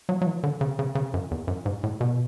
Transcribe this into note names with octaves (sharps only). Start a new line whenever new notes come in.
F#3
F#3
E3
D3
C#3
C#3
C#3
F#2
E2
F#2
G#2
A2
B2